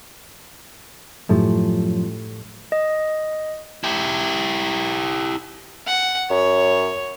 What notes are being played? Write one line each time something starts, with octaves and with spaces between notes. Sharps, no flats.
F#2 A2 F3 A3 G4
D#5
E4 G4
F#5
F#2 C#5